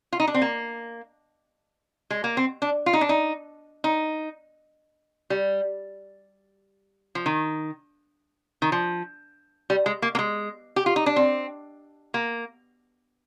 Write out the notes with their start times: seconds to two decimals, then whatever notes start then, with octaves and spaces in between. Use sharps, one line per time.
0.13 F4
0.20 D#4
0.28 D4
0.34 C4
0.42 A#3
2.10 G#3
2.24 A#3
2.37 C4
2.62 D4
2.86 F4
2.93 D#4
3.01 D4
3.09 D#4
3.84 D#4
5.30 G3
7.15 F3
7.26 D#3
8.62 D#3
8.72 F3
9.70 G3
9.86 G#3
10.02 A#3
10.15 A#3
10.19 G#3
10.76 G4
10.86 F4
10.96 D#4
11.06 D4
11.16 C4
12.14 A#3